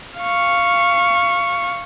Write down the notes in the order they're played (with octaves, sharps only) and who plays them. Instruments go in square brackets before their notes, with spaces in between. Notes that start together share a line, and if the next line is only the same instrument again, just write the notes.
[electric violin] F5 C#6